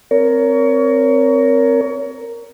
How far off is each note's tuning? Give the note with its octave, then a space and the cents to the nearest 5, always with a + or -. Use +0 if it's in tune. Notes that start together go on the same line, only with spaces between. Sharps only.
C4 +0 A#4 +0 C#5 +30